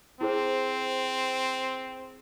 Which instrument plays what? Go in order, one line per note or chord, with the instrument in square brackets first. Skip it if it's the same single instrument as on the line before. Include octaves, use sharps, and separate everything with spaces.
[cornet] C4 [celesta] E4 G#4 C5